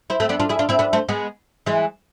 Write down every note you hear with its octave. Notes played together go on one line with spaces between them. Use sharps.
C4 E4
A3 C4
B3 D4
D4 F4
E4 G#4
D4 F4
C4 E4
B3 D4
A3 C4
G#3 B3
E3 G#3